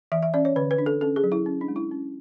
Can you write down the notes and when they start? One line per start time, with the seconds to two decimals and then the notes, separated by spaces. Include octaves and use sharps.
0.12 E3 E5
0.23 E5
0.34 C#4 D5
0.45 C#5
0.56 D3 B4
0.71 B4
0.78 D4
0.86 A4
1.01 C#4 A4
1.16 G#4
1.24 F#3
1.32 E4
1.46 C#4
1.61 D4
1.68 G#3
1.76 E4
1.91 C#4